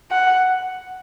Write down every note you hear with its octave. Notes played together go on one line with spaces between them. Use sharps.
F#5